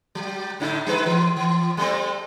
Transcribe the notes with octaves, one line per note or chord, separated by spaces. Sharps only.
F#3
A2 D3 D#4
G3 D#4 B4
E3
E3
G3 A3 C4